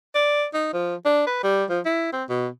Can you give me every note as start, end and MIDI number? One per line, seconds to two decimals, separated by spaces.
0.15 0.45 74
0.54 0.70 63
0.73 0.95 53
1.05 1.26 62
1.27 1.41 71
1.43 1.64 55
1.70 1.80 53
1.85 2.09 64
2.13 2.24 60
2.29 2.47 47